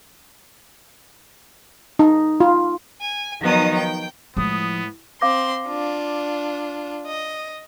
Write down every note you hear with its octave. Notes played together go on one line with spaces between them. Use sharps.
D#4
F4
G#5
D#3 F3 F#3 B3 D#4 D#6
G5
A2 F3 G#3 B3 D#6
C4 F5 C6 D6 A#6
D4 F4
D#5